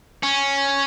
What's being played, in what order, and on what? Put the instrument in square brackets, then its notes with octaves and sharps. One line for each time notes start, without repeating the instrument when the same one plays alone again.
[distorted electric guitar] C#4